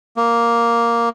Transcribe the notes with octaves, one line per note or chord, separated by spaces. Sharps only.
A#3